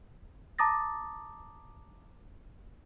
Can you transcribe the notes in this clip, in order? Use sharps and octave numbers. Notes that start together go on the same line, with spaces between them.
A5 A#5 D6 D#6 A6 A#6